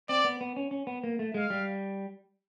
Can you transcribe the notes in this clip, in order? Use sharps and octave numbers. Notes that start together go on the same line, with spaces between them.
C4 D5
B3
B3
C#4
C#4
B3
A#3
A3
G#3 F5
G3